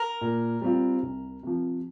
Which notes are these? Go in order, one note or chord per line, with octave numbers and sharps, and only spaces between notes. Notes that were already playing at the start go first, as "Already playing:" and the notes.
Already playing: A#4
A#2
G3 C4 F4
C2
C3 F3